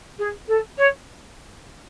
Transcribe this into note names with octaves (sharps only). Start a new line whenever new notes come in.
G#4
A4
C#5